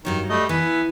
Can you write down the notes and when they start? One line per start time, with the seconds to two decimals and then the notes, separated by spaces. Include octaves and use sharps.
0.05 G2 D#3 F#3 C#5
0.29 G3 A3 D#5
0.49 E3 B3 E5 G#5